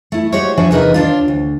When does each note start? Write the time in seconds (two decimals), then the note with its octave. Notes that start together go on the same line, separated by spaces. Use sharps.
0.12 A3 E4
0.32 G#3 F#4 G4 C5 C#5
0.58 F3 D4 F#4 E5 G#5 A5
0.71 E2 C3 D#4 A#4 B4 D#5
0.94 D#2 A#2 D4 F4
1.28 D2